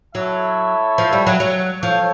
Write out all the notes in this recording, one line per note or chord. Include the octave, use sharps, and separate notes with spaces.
F#3 E4 A4 C#5 E5
F3
G3
F#3
F#3
F3 A4 C#5